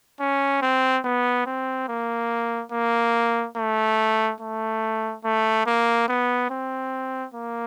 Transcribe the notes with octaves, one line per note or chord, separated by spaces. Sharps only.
C#4
C4
B3
C4
A#3
A#3
A3
A3
A3
A#3
B3
C4
A#3